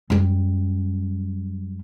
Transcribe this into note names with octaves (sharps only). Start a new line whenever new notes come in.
F#2 G3